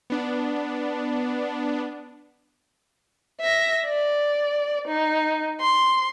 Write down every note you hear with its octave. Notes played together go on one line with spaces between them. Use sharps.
B3 D4
E5 A#6
D5
D#4
C6